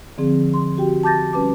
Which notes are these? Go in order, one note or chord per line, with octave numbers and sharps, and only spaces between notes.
D3 F3 C4 G#4
C6
F#4 G4 G5
A5 D6 G6 A6 A#6
G3 C#4 B4 A5 D6